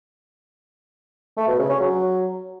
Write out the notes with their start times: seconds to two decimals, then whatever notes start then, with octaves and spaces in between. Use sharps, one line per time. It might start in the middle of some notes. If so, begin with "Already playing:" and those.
1.37 A3
1.48 B2
1.58 C#3
1.69 C#4
1.80 F#3